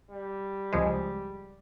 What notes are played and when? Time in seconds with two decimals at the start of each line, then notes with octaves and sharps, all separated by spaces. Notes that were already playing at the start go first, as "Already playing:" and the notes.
0.11 G3
0.73 C#2 F3 G#3